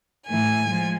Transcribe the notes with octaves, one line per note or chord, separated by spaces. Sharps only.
A2 E3 A3 G#5
F3 G#3